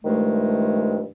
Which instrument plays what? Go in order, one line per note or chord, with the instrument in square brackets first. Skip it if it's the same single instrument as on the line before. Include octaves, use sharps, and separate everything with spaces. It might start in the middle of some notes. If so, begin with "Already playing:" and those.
[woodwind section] G2 D#3 F3 G#3 A3